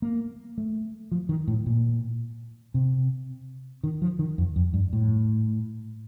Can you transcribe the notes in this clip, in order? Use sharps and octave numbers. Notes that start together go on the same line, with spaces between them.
A#3
A3
F3
D#3
A2
A#2
C3
D#3
F3
D#3
F2
F2
G2
A2